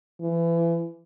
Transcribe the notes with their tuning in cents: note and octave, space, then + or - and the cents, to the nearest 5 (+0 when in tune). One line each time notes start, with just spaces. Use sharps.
E3 +30